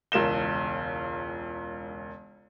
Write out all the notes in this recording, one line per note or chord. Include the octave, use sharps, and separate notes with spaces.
E1 C#2 A#4 E7 G7